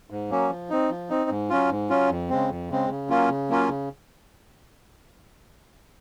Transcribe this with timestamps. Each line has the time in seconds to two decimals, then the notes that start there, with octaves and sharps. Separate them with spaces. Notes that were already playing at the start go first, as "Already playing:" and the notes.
0.10 G#2
0.30 F#3 A#3 C#4
0.50 F3
0.70 C4 D#4
0.90 F3
1.10 C4 D#4
1.30 G#2
1.50 F#3 C#4 F4
1.70 G#2
1.90 F#3 C#4 F4
2.10 F2
2.30 C#3 G#3 C4
2.50 F2
2.70 C#3 G#3 C4
2.90 C#3
3.09 F#3 A#3 C#4 F4
3.29 C#3
3.49 F#3 A#3 C#4 F4
3.69 C#3